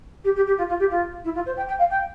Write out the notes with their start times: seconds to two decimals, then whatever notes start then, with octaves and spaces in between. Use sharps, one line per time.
0.24 G4
0.35 G4
0.46 G4
0.57 F4
0.68 F4
0.79 G4
0.90 F4
1.24 E4
1.35 F4
1.46 C5
1.56 G5
1.68 G5
1.79 F5
1.90 G5